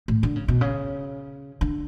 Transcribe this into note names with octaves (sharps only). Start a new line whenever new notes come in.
A2
D3
C#3
B2
C#3
D3